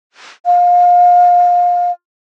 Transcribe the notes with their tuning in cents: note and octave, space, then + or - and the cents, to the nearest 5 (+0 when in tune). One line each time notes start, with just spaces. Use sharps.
F5 +25